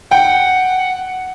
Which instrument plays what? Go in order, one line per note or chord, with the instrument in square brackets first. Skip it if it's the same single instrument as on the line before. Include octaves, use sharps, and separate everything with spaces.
[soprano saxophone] F#5 [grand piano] G5